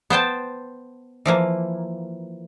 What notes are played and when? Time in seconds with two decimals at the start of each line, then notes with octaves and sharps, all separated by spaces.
0.10 B3 C5 G5 A5
1.26 E3 F3 A#3